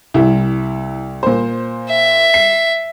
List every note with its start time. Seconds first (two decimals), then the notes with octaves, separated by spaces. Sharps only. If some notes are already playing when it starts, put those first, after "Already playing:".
0.14 C2 E4
1.23 A#2 C5
1.90 E5
2.34 C7